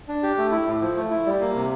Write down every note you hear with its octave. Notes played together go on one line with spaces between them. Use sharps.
D4
G4
A3
E4
A2
F3
A3
E4
G3
A#3
C3